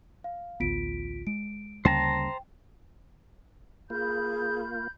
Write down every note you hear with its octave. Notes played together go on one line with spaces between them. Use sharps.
F5
A1 D2 B3 F4 B6 D7
G#3 D7
D2 C#3 G3 A#3 C5 G5 A5 A#5
A#3 F4 G#4 B5 G6